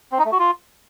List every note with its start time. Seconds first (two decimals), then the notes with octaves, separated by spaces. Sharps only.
0.12 C4
0.19 D#4
0.25 A3
0.32 F#4
0.39 F4